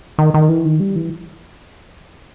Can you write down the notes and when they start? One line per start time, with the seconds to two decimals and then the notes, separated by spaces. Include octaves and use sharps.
0.19 D#3
0.34 D#3
0.49 E3
0.65 D#3
0.80 G3
0.96 E3